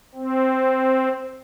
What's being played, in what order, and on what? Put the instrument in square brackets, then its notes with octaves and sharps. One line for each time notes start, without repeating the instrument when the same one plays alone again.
[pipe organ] C4